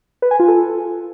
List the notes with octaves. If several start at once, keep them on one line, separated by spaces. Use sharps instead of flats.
B4
G#5
F4
A4